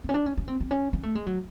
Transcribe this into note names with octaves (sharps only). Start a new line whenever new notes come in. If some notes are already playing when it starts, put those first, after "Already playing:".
C4
C#4
D4
C#4
C#4
C4
C4
C#4
C#4
A3
G#3
F#3